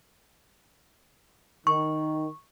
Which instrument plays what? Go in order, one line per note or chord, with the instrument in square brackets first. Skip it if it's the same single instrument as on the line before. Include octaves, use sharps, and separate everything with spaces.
[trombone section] D#3 [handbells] C#6